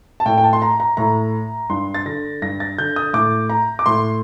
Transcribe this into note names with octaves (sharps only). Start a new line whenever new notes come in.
A5
A2 G5
G5
A5
C6
A#5
A#5
A2 A#5
G2 C6
A6
D3 A#6
G2 A#6
A6
D3 G6
D#6
A2 D6
A#5
D6
A2 C6